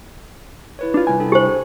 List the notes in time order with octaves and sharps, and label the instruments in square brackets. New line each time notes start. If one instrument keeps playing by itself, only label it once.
[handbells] E4 B4 C#5
[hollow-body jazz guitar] D4 F4
[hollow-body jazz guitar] C2 G#5 [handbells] E4
[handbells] D4 A4 G5
[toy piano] G4 C5
[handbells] G#5